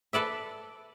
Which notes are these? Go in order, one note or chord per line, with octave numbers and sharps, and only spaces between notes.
A4 B4 D5 E5